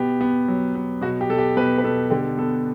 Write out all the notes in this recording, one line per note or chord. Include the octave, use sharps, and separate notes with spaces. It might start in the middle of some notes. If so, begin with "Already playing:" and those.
Already playing: B2 B3 G4
B3
F#3
B3
B2 F#4
G4
B2 A4
G4
B2 B4
B4
B2 A4
D3 G4
B3 A4